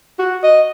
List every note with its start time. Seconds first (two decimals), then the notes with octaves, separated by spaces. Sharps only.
0.19 F#4
0.43 D#5